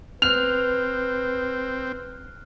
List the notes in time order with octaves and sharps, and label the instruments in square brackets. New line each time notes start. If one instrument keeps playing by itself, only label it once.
[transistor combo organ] C4 [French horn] B4 [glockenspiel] F6 F#6 [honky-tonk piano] F7